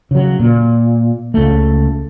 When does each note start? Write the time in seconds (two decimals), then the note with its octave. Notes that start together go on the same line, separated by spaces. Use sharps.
0.11 C#3 F#3
0.39 A#2
1.34 C#2 A3